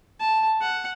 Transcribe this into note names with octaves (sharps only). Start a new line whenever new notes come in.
A5
F#5